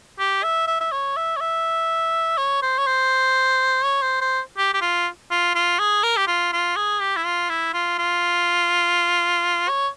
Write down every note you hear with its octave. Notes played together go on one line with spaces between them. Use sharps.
G4
E5
E5
E5
C#5
E5
C#5
E5
C#5
C5
C#5
C5
C#5
C5
C5
G4
G4
F4
F4
F4
G#4
A#4
G4
F4
F4
G#4
G4
E4
F4
E4
F4
F4
C#5